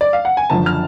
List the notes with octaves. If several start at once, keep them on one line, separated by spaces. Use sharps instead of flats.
D5
F5
F#5
G#5
F#1 F#2 D3 F3 A5
F6